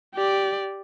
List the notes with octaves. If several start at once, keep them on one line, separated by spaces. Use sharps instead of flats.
G4 D5